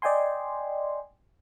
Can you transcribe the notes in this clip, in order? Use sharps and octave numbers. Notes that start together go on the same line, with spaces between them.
D5 D#5 G5 G#5 C6